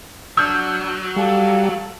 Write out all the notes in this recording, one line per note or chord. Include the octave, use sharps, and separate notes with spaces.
F#3 D4 E6 F6 G6
G3 A4 F5